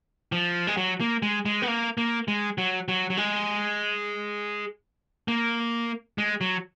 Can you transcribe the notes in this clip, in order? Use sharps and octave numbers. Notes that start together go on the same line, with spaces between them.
F3
G#3
F#3
A#3
G#3
G#3
B3
A#3
A#3
G#3
F#3
F#3
F#3
G#3
A#3
G#3
F#3